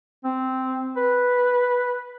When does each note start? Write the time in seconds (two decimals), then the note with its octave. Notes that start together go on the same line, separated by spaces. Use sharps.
0.24 C4
0.97 B4